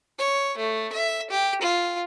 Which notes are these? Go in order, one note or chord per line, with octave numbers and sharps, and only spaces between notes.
C#5
A3
E5
G4
F4